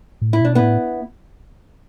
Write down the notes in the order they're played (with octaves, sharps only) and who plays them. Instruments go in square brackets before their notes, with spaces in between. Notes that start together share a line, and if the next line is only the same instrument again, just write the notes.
[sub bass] A2
[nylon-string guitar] E4
[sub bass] B2 [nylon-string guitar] D4
[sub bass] A2 [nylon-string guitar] B3 E4